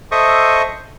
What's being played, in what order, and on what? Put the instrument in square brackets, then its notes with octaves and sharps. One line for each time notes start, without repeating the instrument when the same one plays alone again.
[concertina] A4 C5 D#5 E5 C#6 D#6